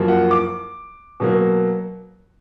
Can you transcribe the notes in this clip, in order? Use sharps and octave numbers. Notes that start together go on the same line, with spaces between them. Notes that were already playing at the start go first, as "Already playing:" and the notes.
Already playing: F#2 F3 A#3
F#5
D6
B2 F#3 A#3